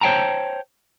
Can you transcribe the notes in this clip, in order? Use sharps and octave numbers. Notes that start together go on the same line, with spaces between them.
C5 C#5 F5 G5 A5 A#5